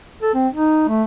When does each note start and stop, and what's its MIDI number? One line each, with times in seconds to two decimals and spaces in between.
0.22 0.32 69
0.34 0.48 60
0.53 0.87 63
0.88 1.03 57